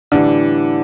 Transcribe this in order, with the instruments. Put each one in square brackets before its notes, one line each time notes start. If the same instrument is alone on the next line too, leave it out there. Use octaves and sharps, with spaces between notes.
[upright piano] A2 E3 G3 [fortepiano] D3